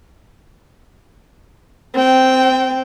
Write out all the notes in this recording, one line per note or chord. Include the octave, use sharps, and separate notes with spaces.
C4 G5